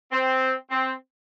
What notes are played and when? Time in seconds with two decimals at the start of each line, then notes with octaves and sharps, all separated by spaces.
0.12 C4
0.71 C4